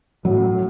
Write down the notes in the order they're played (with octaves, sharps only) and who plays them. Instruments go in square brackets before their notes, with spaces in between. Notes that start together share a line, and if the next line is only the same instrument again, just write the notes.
[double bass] A2 [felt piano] F#3